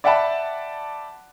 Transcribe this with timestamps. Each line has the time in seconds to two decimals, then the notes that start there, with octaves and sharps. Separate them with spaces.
0.04 D5 E5 F#5 G5 A5 B5